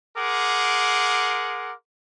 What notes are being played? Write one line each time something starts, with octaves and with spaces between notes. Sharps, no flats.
G#4 A#4 F#5 C6 D6